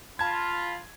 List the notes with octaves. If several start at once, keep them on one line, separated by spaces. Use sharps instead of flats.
F4 A5 B5 G#6